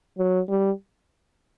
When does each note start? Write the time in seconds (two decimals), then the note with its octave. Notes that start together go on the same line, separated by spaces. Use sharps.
0.18 F#3
0.49 G3